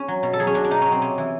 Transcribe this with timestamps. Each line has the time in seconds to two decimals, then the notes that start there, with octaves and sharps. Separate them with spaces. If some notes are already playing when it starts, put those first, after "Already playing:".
Already playing: C#4
0.08 F#3
0.23 B2
0.33 A4
0.39 F#3 G#4
0.47 C#4
0.54 B2 D4
0.64 D4
0.71 B2 D#4
0.82 F#3 C#4
0.92 C4
1.02 C3 C#4
1.18 E3